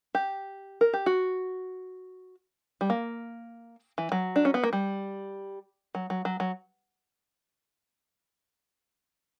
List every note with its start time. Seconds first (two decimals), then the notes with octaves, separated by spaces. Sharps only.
0.15 G4
0.81 A#4
0.94 G4
1.06 F#4
2.81 G3
2.90 A#3
3.98 E3
4.12 F#3
4.36 D4
4.45 C#4
4.54 B3
4.63 A#3
4.73 G3
5.95 F#3
6.10 F#3
6.25 F#3
6.40 F#3